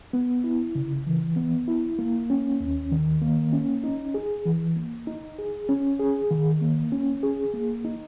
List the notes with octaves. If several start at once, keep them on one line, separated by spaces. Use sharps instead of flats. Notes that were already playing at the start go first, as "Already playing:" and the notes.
B3
E4
C#3
E3
B3
E4
A#3
C#4
D#2
D#3
A#3
C#4
D#4
G#4
E3
A#3
D#4
G#4
C#4
G#4
D#3
A#3
C#4
G#4
A#3
D#4